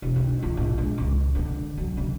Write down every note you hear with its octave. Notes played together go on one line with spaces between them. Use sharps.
E1
D#3
F4
A#1
G#3
C#2
D3
F#3
C#3